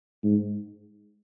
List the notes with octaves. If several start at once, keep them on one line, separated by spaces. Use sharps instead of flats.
G#2